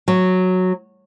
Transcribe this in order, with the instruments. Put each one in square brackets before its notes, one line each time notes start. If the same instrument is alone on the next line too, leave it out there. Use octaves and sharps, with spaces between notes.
[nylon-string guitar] F#3